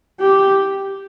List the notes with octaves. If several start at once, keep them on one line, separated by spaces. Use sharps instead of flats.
G4